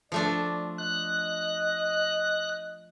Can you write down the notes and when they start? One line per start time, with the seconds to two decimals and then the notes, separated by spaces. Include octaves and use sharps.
0.12 F3 A3 D4 D5
0.78 D#5 F#6